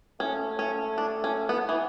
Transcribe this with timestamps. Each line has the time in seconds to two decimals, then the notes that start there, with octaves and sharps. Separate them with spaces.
0.20 A3 C#4
0.59 C#4
0.98 D4
1.24 C#4
1.49 B3
1.69 E3